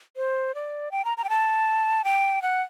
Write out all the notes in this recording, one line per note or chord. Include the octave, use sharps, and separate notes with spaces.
C5
D5
G5
A#5
A#5
G5
A5
G5
F#5